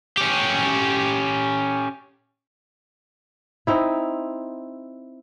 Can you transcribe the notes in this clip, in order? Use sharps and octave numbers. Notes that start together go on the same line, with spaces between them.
C#4 G4
C4 D#4 E4